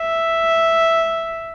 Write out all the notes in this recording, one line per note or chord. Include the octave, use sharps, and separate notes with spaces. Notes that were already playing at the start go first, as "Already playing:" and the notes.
Already playing: E5